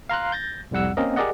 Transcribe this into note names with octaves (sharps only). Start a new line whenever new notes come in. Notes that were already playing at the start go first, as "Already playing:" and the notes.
F5 A#5 C6 F#6
G6 A6 A#6
C2 F2 G3 F#5 E6
A#3 C4 C#4 A#4 D#5
G4 G#4 A#4 D5 D#5 F#5